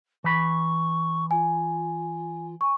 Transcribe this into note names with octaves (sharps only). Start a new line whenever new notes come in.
E3 B5 C#6
F4 G#5
G#5 C#6